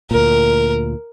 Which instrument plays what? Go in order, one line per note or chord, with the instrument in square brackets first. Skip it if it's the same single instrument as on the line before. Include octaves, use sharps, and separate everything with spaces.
[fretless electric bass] D2 A#2 [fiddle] A#4